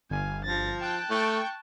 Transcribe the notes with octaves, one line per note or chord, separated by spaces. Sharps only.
G1 F5 G#5
F3 A6 A#6
G5 A5 F#6
A3 G5 C#6